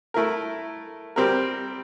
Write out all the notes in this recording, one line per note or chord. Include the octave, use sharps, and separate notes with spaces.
A3 E4 A#4
G3 C4 G4 A#4